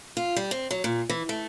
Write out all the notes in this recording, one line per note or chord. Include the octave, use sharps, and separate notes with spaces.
F4
G3
C4
F#3
A#2
E3
A3